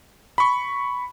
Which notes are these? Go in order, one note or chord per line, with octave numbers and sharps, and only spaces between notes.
B5 C#6